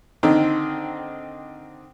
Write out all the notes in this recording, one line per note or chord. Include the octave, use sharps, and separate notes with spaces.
D3 D#3 C4 D#4